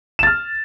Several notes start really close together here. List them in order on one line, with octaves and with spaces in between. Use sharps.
E7 A6 F6